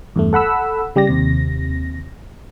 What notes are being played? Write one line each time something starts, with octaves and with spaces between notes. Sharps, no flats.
E2 G2 A3
A4 F#5 B5 E6
C#3 G3 G4 D5 A#6
D#2 C3 A#6